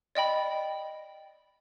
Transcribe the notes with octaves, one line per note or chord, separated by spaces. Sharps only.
D5 D#5 G5 B5